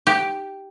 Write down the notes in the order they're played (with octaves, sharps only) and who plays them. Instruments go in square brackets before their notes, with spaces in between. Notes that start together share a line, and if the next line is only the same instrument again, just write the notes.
[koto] G4